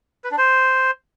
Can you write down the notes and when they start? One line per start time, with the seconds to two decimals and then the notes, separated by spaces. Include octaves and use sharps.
0.24 B4
0.31 D4
0.38 C5